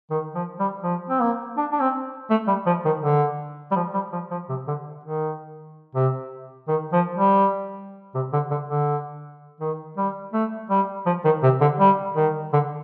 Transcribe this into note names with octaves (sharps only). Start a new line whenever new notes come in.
D#3
F3
G3
F3
C4
A#3
D4
D4
C4
A3
G3
F3
D#3
D3
G3
F3
G3
F3
F3
C3
D3
D#3
C3
D#3
F3
G3
C3
D3
D3
D3
D#3
G3
A3
G3
F3
D#3
C3
D3
G3
D#3
D3